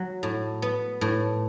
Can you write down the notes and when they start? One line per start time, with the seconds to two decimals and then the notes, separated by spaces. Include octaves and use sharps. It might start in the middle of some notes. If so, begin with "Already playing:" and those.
Already playing: F#3
0.23 A2
0.62 B3
1.01 A2